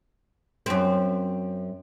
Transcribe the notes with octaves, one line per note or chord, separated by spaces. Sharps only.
F#2 C4